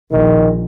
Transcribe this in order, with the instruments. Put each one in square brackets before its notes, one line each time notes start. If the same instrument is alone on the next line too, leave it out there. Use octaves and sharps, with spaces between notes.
[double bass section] A#1 A#2 [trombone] D#3